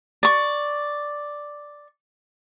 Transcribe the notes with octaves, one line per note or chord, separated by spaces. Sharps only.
D5 C#6